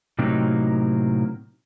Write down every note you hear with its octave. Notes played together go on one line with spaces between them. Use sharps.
A2 C3 F#3 A#3 C4 D#4